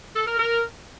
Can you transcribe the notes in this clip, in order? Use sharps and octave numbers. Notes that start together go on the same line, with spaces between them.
A4
A#4
A#4